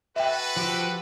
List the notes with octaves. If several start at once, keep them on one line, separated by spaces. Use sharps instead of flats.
F#4 A4 B4 E5 G5
F3 G4